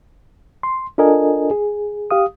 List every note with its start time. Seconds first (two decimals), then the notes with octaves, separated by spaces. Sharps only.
0.63 C6
0.98 D4 F4 A4 A#4 D#5 G#5
1.51 G#4
2.11 G4 F5 D#6